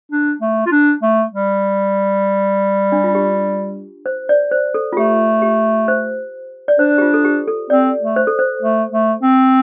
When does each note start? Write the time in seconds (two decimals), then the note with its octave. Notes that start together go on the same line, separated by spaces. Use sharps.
0.12 D4
0.41 A3
0.66 F4
0.71 D4
1.02 A3
1.32 G3
2.92 D4
3.04 F4
3.15 G4
4.06 C5
4.29 D5
4.51 C5
4.74 A4
4.93 F4
4.96 A3 G4
5.42 G4
5.88 C5
6.68 D5
6.79 D4 C5
6.98 G4
7.02 F4
7.14 A4
7.25 G4
7.48 A4
7.70 C4 D5
8.01 A3
8.16 C5
8.27 A4
8.39 C5
8.62 A3
8.92 A3
9.22 C4